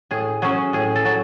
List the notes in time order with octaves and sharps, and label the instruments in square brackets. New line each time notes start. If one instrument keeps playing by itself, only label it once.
[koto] A2 G#4
F#3 C#4 G#4
A2 G#4
A4
F#3